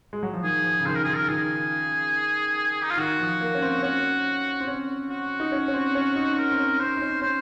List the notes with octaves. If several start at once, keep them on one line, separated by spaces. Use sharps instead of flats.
G#3
F#3
F3
D#3 G#4
F3
C#3
D#3 C5
A#4
D#3 G#4
A#4
D#3 G#4
D#4
F4
D#3 F#4
F3
A#3
C#4
C4
C#4 F#4
C4
C#4
F#4
D#4
C#4
C#4
C4
C#4
D#4
A#4
C4
C#4
C4 C5
D#4
C#4
C#4 C5